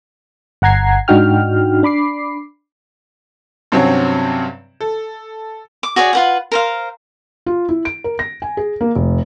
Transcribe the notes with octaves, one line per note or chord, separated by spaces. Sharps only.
G1 F#5 A#5 G#6 C7
G#2 D4 D#4 F#4 G5 F6
D4 B5 D6 C7
G2 C3 F#3 C4 C#4 C#5
A4
D6
F#4 G#4 C#5 D5
F4 B4 F#5
A#4 C5 F5
F4
E4
D7
A#4
A#6
G#5
G#4
A#3
F1